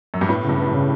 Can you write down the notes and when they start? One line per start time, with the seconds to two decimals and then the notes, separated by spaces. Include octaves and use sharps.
0.14 F#2
0.21 G2
0.29 A2 B3
0.44 C#3
0.49 G2
0.59 B3
0.69 G2
0.74 C#3